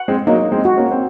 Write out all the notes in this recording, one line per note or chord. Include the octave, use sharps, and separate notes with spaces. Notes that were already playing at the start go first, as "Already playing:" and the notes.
Already playing: F#5
G#3 C4
F#3 A#3 D#4
G#3 C4
F#4
A#3 C#4
C4